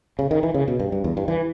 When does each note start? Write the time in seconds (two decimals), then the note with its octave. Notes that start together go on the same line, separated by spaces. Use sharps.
0.19 C#3
0.31 D#3
0.43 E3
0.54 C#3
0.68 B2
0.80 G2
0.92 G2
1.04 E2
1.17 G2
1.28 E3